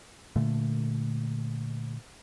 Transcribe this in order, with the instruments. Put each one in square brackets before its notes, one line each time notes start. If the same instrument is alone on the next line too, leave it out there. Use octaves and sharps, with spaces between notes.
[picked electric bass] A#2 D3 A3